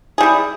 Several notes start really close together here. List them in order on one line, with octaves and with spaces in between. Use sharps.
G#4 G3 E4